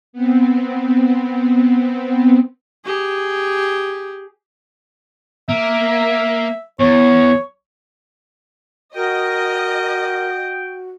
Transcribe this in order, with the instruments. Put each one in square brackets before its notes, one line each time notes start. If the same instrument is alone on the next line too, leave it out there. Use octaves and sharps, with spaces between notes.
[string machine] B3 C4
[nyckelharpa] G4 G#4
[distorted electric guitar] A#3 [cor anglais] E5
[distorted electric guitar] E2 [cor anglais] C#5
[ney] F#4 [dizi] A#4 [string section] D#5 [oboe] G5